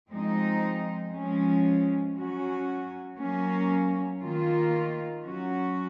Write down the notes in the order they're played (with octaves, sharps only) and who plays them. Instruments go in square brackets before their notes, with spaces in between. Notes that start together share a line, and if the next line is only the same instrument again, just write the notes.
[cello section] F3 G#3 C4 D#4
F3 G#3 C#4
F#3 C#4 F#4
F#3 A#3 C#4
D#3 A#3 F4
F#3 C#4 F#4